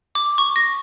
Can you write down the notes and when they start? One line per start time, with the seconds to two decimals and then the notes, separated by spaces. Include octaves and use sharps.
0.15 D6
0.38 C#6
0.56 A#6